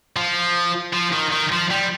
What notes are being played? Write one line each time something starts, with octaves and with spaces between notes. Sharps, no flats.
F3
F3
D#3
D#3
F3
G3